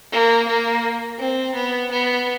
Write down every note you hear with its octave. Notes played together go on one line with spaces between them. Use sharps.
A#3
A#3
C4
B3
B3